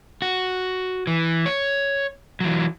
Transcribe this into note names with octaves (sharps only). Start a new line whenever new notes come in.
F#4
E3
C#5
E3 F#3